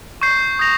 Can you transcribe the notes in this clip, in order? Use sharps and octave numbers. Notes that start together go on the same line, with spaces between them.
C#6 G6 C7
D#6 G6 A#6 F7